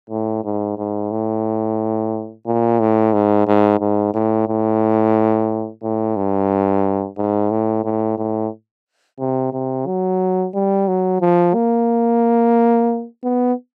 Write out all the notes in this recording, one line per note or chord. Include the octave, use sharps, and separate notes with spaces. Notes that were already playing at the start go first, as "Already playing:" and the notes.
A2
G#2
G#2
A2
A#2
A2
G#2
G#2
G#2
A2
A2
A2
G2
G#2
A2
A2
A2
C3
C3
F#3
G3
F#3
F3
A#3
B3